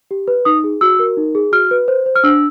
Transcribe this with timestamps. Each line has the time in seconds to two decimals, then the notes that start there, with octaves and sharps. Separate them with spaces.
0.11 G4
0.28 B4
0.45 D#4 D#6
0.64 G#4
0.81 F#4 E6
0.99 A#4
1.17 D#4
1.35 G#4
1.52 F#4 F6
1.71 B4
1.88 C5
2.06 C5
2.16 F6
2.24 D4 E6